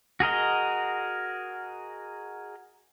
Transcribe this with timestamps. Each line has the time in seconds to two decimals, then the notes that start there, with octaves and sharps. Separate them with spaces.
0.20 F#4 G#4 A#4 D#5